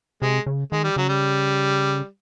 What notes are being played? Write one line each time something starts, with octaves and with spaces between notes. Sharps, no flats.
C3 G#3
C#3
D#3 G#3
G3
C#3 F#3
G3